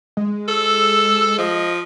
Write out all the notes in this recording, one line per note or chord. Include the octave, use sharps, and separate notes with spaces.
G#3
A4 E6
F3 D#5